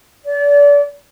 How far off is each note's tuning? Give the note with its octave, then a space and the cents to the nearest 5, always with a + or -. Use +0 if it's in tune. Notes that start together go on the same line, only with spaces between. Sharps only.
D5 -35